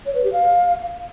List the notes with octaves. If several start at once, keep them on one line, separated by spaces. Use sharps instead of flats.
C#5
B4
G4
F5